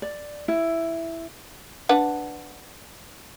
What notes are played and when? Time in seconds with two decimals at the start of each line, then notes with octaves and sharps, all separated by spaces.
0.02 D5
0.48 E4
1.89 D4 B4 F#5